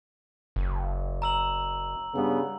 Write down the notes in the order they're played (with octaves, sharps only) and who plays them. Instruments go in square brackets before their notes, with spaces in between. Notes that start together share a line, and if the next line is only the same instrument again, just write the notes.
[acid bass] F#1
[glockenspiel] A#5 E6 F#7
[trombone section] G2 C#3 B3